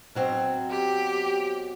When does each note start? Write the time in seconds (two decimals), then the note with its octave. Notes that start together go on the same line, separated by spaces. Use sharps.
0.15 B2 F#3 C4
0.70 G4